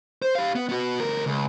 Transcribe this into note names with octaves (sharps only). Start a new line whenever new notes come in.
C5
G4 F5
B3
B3 F#4
D2 A#4
C#2